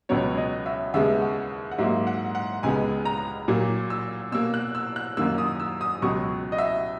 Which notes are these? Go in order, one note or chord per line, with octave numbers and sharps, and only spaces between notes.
C#2 B2 F#3 B3 C#5
D#5
E5
D#2 C#3 G#3 B3 E5
F#5
F#5
G#2 F#3 A#3 E5
F#5
F#5
C#2 C#3 G#3 B3 G#5
A#5
A#2 F#3 A#3
E6
B2 A#3 E6
F#6
E6
F#6
F#2 D#3 A#3 E6
D#6
E6
D#6
C#2 B2 F#3 C#6
D#5
E5